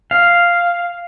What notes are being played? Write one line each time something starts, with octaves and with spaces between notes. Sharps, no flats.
F5